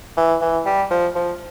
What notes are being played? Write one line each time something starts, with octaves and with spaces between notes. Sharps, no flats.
E3
E3
G3
F3
F3